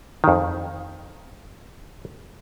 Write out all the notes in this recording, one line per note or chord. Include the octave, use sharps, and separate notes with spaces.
F2 D#3